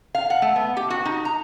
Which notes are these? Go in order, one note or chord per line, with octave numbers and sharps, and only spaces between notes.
F5
F#5
A3
B3
G4
F#4
D#4
A#5